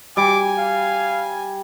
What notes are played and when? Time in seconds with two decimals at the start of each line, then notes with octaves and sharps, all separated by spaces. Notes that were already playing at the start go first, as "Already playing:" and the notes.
0.17 G3 G#5 D6
0.58 F5